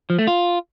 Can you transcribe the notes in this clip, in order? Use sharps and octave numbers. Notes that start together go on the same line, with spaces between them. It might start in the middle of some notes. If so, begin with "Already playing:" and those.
F3
A3
F4